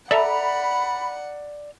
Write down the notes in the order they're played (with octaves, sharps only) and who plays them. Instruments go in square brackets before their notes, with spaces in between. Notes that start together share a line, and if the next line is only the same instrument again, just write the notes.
[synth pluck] A4 E5 [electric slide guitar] D5 A#5 [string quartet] F#5 [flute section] B5